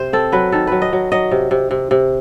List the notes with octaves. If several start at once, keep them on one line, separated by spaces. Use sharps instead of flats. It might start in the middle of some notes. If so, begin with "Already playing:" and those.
Already playing: C3 C5
C4 A4
F#3 B4
D#3 A4
F#3 B4
D#5
F#3
F#3 D#5
C3
C3
C3
C3